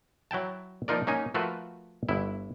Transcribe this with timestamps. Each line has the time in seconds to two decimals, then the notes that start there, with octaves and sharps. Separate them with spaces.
0.31 F#3 E4 G5 A5
0.88 F3 A#3 D#4 F4 A#4 D5
1.07 A#3 C#4 D#4 G#5
1.34 F3 A3 F4 F#4 A#4 B4
2.09 G1 E4